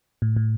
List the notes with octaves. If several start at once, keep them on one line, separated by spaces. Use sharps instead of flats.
A2
A2